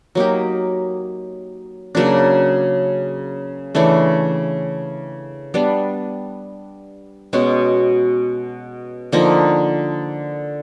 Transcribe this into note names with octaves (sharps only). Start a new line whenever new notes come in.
F#3 A#3 D#4 G4
C#3 F#3 A#3 D4
C#3 E3 A3 D4
G3 B3 D4
B2 G#3 C#4 F#4
D3 F3 A#3 D#4